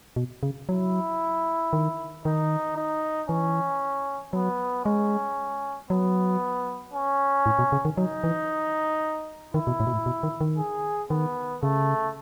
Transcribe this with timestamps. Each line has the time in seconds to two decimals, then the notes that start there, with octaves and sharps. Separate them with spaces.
0.16 B2
0.43 C#3
0.69 F#3 E4
1.73 D#3
2.25 D#3 D#4
2.77 D#4
3.29 E3 C#4
4.33 F#3 B3
4.85 G#3 C#4
5.90 F#3 B3
6.93 C#4
7.46 A2
7.59 B2
7.72 C#3
7.85 D#3
7.98 F#3 D#4
8.24 E3
9.54 D#3 E4
9.67 B2
9.80 A2
9.87 B2
9.93 A2
10.06 B2
10.23 D#3
10.41 D#3
10.58 G#4
11.10 D#3 B3
11.63 C#3 A3